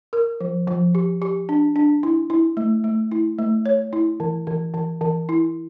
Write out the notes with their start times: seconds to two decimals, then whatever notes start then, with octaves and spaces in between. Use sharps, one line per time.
0.13 A#4
0.40 F3
0.67 F3
0.95 G4
1.22 G4
1.49 D4
1.76 D4
2.03 E4
2.30 E4
2.57 A3
2.84 A3
3.12 E4
3.39 A3
3.66 C#5
3.93 E4
4.20 E3
4.47 E3
4.74 E3
5.01 E3
5.29 E4